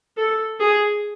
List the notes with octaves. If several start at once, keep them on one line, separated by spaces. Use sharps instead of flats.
A4
G#4